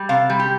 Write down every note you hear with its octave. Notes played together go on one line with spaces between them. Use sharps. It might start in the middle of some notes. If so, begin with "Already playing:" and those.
Already playing: G3
C3 F5
G3
G4